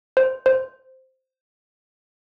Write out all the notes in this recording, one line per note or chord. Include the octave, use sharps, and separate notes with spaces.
C5
C5